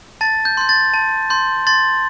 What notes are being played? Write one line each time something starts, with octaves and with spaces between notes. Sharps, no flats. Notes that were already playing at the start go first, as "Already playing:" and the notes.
A5 A6
G6
C6 G6
A6
A5
C6 G6
C6 A6